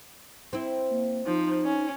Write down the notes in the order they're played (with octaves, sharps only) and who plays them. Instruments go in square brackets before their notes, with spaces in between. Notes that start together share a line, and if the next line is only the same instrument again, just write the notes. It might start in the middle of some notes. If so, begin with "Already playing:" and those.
[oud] C4 E4
[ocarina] A#3
[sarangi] F3 [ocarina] D#4
[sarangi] C#4